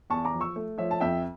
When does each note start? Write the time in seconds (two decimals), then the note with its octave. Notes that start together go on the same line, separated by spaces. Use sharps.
0.10 E2 A5 C#6
0.25 A#5 D6
0.34 F3
0.41 C#6 E6
0.56 A3
0.78 F3 C#5 E5
0.91 A5
1.00 F2 E5 G5